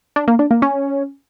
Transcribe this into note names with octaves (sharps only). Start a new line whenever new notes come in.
D4
A#3
D4
A#3
C#4